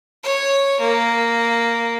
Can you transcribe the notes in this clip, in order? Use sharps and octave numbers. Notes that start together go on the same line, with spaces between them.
C#5
A#3